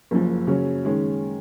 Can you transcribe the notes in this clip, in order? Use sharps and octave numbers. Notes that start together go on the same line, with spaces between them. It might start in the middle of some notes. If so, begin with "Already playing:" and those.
F#1 F#2 F3
C#3 F#3 C#4
D#3 G#3 C#4